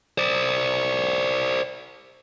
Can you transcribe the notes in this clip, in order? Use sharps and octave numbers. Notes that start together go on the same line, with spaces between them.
C5 D5